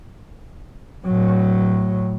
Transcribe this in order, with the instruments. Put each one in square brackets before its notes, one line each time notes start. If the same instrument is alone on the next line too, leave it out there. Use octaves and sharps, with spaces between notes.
[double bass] A2 F#3